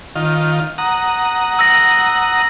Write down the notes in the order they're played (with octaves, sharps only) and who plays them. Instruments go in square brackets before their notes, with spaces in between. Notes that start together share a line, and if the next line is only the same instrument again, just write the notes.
[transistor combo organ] D#3 F4
F#5 A#5 D#6
[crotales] E6 A#6